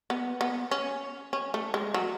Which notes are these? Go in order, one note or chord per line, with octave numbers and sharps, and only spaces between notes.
B3
B3
C#4
C#4
A3
G#3
F#3